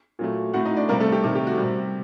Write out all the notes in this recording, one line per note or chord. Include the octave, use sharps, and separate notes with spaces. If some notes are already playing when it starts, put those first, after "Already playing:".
A#2 F#3 A3
A2 A3 F#4 F#5
D#4 D#5
D4 D5
C3 G3 A#3 A#4
A3 A4
G4
C3 D#3 A3
G4
F#4
G3
C3